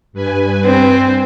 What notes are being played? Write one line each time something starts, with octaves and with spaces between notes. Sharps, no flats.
G2 B4 G#5
C4